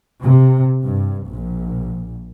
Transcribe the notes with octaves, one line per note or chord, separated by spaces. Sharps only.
C3
G2
A#1